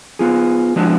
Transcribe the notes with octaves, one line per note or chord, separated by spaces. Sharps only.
B3 F4 G#4
F3 G#3 B3 D4 F#4